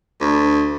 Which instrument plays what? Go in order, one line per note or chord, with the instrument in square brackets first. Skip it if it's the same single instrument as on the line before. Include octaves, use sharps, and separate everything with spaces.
[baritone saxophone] D2